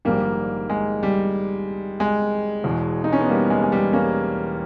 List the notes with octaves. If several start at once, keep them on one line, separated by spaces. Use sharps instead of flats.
A#1 G#2 D#3 G3 A#3
G#3
G3
G#3
E1 E2 B2
D#4
C#4
B3
G3 A#3
G#3
G#3
G3
A#3 C#4